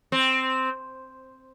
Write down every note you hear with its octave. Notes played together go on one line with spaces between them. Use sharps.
C4